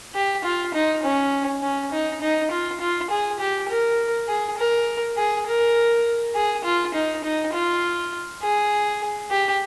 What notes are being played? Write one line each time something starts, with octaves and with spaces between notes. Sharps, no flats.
G4
F4
D#4
C#4
C#4
D#4
D#4
F4
F4
G#4
G4
A#4
G#4
A#4
G#4
A#4
G#4
F4
D#4
D#4
F4
G#4
G4